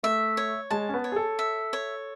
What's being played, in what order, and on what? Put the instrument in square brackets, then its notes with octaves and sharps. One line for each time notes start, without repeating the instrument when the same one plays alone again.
[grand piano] A3 [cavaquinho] E5
[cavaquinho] C#5
[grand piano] G#3 [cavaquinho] A5
[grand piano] C#4
B3
[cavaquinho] C#5
[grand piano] G#4
A4
[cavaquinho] E5
C#5